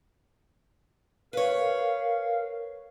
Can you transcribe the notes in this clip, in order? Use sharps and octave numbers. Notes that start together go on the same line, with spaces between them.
A#4 B4 C#5 F5